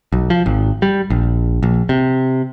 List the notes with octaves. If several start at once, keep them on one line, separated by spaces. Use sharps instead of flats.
B1
F3
G#1
G3
A#1
A#1
C3